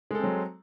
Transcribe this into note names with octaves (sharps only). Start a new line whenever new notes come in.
F#3 G#3 C4 A4